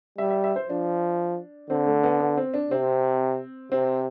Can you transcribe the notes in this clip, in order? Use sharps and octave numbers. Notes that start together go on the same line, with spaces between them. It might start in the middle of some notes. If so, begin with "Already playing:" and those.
G3 E5
E5
E5
C5
F3 D4
D3 C4
A3
B3
B3
C4
D4
C3 C4
C3 C4